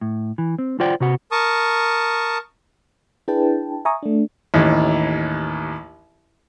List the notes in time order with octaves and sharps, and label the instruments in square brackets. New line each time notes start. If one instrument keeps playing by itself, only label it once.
[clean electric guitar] A2
E3
C4
F4 C5 D5 F#5 G5
C3 F#4 F#5
[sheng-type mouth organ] A#4 A5 C#6 D#6
[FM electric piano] D4 E4 G#4 B4 G5 A5
E5 G#5 A#5 C#6 D#6
A3 D4
[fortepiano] A1 D#2 E3